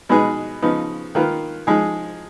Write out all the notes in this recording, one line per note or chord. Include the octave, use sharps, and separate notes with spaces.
B2 G#3 D#4 G#4 B4
C#3 F3 B3 D#4
D#3 A#3 F4 B4
F3 G#3 D#4 G#4